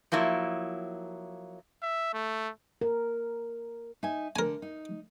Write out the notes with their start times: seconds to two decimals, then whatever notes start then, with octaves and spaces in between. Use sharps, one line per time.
0.12 F3 F#3 A#3 E4
1.83 E5
2.13 A3
2.81 A#4
4.03 D#4 E5 G#5
4.36 D3 A#4 G#5
4.62 D#4